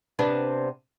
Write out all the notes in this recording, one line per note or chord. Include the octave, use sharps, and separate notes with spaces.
C3 B3 D4